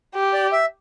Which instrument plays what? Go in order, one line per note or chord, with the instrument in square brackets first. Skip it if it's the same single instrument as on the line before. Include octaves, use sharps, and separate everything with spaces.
[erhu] G4
[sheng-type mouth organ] D5
E5